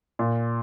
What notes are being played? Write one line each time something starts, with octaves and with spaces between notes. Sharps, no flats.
A#2